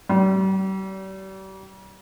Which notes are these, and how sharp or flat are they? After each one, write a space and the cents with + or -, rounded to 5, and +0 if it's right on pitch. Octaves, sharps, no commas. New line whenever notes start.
G3 -40